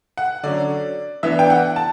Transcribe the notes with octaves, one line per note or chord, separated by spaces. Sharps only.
F#5
D3 F#3 C#4 D5
E3 B3 D4 E5
G5
F#5
A5